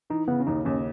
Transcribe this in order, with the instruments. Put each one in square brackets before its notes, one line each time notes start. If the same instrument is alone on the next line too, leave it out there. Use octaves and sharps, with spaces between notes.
[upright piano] E3 [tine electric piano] D#4
[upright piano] C#3 [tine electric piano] B3
[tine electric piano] C#4
[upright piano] D#2 [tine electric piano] D#4
[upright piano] D#2 [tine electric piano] C#4